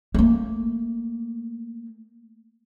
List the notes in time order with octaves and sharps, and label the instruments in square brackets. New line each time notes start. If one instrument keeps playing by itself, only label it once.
[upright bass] A3 A#3